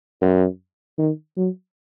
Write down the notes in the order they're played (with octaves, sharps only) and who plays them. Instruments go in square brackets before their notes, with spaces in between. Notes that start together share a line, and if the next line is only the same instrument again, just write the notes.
[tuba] F#2
D#3
F#3